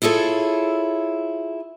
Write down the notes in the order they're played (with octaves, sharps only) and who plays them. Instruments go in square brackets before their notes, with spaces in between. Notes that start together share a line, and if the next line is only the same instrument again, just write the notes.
[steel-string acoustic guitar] E4 F4 G#4 A4 C#5